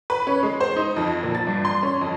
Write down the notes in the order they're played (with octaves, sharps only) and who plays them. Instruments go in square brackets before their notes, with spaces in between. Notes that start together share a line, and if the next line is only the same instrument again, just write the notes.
[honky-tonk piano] B4
C#4
G#3
C5
D#4
F2
A#2
A6
G2
C6
C#4
F2